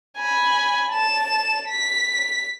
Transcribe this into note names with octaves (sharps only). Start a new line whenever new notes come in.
G#5 B5
A5 E7
B6